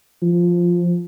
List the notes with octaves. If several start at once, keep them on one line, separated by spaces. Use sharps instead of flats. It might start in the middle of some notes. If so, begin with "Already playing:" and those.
F3